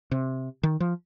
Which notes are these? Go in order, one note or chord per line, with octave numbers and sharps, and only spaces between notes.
C3
D#3
F3